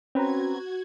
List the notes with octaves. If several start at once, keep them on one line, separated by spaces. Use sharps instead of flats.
C4 C#4 F#4 B4 A#5 G#6